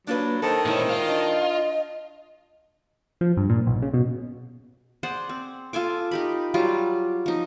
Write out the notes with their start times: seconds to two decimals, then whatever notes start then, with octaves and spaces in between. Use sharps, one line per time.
0.07 F#3 A#3 D4 F4 B4
0.42 D#3 A4 C5
0.66 A#2 G#3 C#4 E4
0.89 F4
1.08 D4 D#5
3.21 F3
3.37 G2
3.50 A#2
3.67 B1
3.82 C#3
3.94 B2
5.03 G#4 C5 D5 F#5
5.29 C4
5.73 F4 A4 G#5 D6
6.11 D#4 G4 B5
6.54 F#3 G3 F4 D6
7.26 F3 D#4